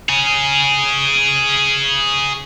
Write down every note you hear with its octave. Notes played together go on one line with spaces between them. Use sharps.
G#4 C#5